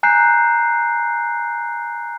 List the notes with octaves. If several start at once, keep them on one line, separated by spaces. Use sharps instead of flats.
G#5 A#5 F#6 G6 C7